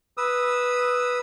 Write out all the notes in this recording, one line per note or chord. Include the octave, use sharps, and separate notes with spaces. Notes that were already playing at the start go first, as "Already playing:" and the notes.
B4 D#6 E6